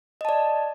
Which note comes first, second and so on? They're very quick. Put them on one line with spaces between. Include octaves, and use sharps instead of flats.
D#5 A5 D5